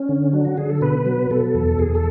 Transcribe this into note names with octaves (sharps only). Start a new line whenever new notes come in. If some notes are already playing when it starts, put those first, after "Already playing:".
Already playing: C#4
D3
F#3 D4
F#4
D3 G#4
A4
B2 B4
F#3
B2 A4
E2
E2 G#4
A4